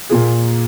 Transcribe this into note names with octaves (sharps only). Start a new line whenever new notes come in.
A#2 A#3 F4 G#4